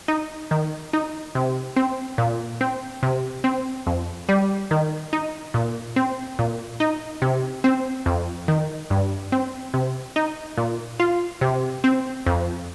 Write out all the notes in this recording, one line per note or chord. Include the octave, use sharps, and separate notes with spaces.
D#4
D#3
D#4
C3
C4
A#2
C4
C3
C4
F2
G3
D#3
D#4
A#2
C4
A#2
D#4
C3
C4
F2
D#3
G2
C4
C3
D#4
A#2
F4
C3
C4
F2